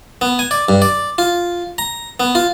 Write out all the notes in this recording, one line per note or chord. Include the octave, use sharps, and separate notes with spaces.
B3
G#5
D5
G2
D5
F4
A#5
B3
F4